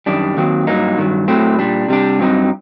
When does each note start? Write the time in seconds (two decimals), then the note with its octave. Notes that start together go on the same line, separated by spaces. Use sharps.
0.06 F#2 D#3 G3 D4
0.37 D#2 D#3 F#3 C4
0.67 G2 F#3 A#3 D#4
0.98 G2 D#3 F#3
1.28 A2 F#3 A3 C4
1.59 A#2 G3 D4
1.88 C3 G3 D4
2.19 G2 F#3 C4 D#4